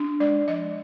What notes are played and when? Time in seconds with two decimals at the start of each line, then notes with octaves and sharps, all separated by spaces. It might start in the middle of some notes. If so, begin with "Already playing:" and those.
Already playing: D4
0.20 G#3 D5
0.48 F3 D#5